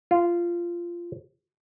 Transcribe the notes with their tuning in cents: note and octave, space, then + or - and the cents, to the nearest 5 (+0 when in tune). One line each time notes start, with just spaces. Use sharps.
F4 -15